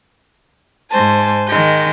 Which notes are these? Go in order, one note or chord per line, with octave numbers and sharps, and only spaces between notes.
G#2 C5 G#5 A5
D#3 G#3 G6